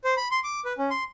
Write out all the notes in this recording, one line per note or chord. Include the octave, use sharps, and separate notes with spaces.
C5
B5
C6
D6
B4
C#4
C6